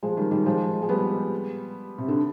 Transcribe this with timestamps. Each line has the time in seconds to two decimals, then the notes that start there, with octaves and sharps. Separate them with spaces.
0.03 F3 G#3
0.17 D#3 G3
0.31 D#3 G3
0.46 F3 G#3
0.82 G#3
0.89 G3 B3
1.98 C3
2.08 D3